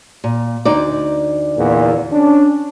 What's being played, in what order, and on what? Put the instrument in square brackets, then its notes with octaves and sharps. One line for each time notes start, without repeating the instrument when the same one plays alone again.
[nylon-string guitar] A#2
D2 D#4 D5
[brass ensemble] E2 A#2
C#4 D4